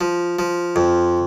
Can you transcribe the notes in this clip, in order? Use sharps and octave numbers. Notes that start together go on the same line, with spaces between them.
F3
F3
F2